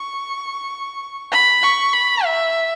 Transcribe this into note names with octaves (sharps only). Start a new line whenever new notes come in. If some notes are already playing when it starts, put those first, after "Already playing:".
Already playing: C#6
B5
C#6
B5
E5